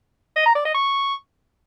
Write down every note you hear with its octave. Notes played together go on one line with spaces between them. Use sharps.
D#5
A#5
D5
D#5
C#6